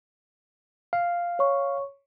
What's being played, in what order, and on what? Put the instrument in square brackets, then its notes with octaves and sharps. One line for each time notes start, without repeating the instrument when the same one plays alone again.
[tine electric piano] F5
[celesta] C#5 C#6